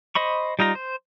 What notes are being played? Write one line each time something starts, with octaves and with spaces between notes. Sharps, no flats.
C5 D#5 B5 C#6
G3 D#4 F4 A#5
C5